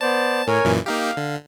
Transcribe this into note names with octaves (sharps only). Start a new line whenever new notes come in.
B3 C5 D5 A5
A2 A#4 C#5 G#5
F#2 A#2 E3
A#3 D#4 G4 F5
D3